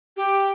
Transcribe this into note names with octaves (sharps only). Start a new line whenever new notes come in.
G4